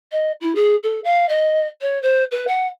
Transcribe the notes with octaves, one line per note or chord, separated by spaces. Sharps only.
D#5
E4
G#4
A4
F5
D#5
C#5
C5
B4
F#5